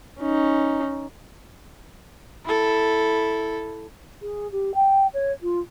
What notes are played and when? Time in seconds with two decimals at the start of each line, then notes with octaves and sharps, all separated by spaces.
0.20 C#4 D#4
2.45 E4 A4
4.21 G#4
4.51 G4
4.74 G5
5.13 C#5
5.42 F4